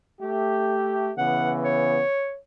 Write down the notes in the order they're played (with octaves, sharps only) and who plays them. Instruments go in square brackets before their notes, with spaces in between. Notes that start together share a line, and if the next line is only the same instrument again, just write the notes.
[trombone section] A3 G4
[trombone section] C#3 E3 B3 [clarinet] F#5
[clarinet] C#5